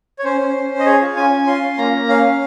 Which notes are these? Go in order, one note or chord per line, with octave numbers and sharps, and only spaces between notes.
C#5
C#4 C5
C#4
C#4
C#4
D#5
G#4 C#5
F4
C#4 G#5
C#4
F4 C6
C#4
A#3 A#5
A#3
C#4 F5
C#4